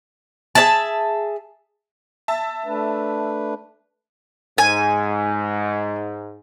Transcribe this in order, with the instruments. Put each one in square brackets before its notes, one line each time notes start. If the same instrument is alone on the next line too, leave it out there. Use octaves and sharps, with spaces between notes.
[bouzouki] G#4 D5 E5 A5
[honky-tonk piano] E5 A5
[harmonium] A3 D4 B4
[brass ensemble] G#2 [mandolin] G#5